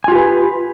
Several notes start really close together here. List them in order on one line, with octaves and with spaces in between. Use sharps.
G#5 F4 G4 B4